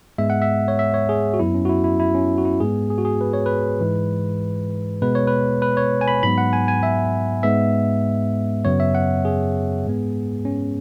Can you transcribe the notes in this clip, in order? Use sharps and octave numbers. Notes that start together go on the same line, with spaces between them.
G#2 G#3 B3 E5
F#5
E5
C#5
E5
C#5
G#4
F#4
F#2 F#3 B3 E4
C#4
F#4
E4
E4
E4
C#4
F#4
E4
G#2 G#3 B3 G#4
G#4
F#4
G#4
B4
C#5
B4
G#2 E3 G#3
B2 G#3 B3 B4
C#5
B4
B4
C#5
G#5
B5
G#2 F#3 B3 B5
F#5
G#5
G#5
E5
G#2 G#3 B3 E5
F#2 C#3 F#3 B3 C#5
E5
F#5
G#4
G#2 G#3 B3
C#4